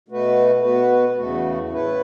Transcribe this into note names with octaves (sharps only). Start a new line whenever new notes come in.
B2 A3 F#4 B4
B2 B3 F#4 B4
E2 C#3 A3 F#4
A2 A3 E4 B4